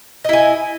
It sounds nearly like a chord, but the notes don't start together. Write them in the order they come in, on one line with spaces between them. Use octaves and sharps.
D#5 E4 G#5